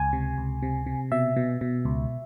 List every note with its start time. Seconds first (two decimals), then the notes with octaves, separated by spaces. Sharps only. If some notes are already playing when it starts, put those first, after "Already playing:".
Already playing: C#2 G#5
0.13 C3
0.38 C#2
0.63 C3
0.86 C3
1.11 B2 E5
1.36 B2
1.61 B2
1.85 C#2